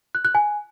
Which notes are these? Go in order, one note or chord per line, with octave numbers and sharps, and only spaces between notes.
F#6
F#6
G#5